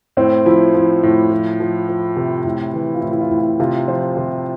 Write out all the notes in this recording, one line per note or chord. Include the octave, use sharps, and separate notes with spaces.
A2 C4
F3 E4
F3 E4
A2
F3
F3
F3
C3
A2
E3
F4
A2 E4
E4
F4
A2
F4
C3 F4
F3 C5
C3